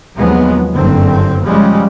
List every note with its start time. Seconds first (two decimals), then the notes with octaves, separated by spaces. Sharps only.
0.17 F1 D#2 F3 F#3 G#3 B3
0.74 F#1 G2 D3 C4
1.46 C#3 F3 G3 G#3